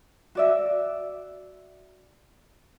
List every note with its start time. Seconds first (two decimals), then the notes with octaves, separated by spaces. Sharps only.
0.35 F#4 D5 E5